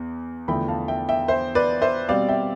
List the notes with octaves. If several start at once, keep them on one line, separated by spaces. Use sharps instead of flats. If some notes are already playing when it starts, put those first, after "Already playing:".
Already playing: E2
E2 D3 F3 A3 E4 G5 B5
F5 A5
E5 G5
E5 G5
C5 E5
B4 D5
C5 E5
B2 G3 C4 D5 F5
E5 G5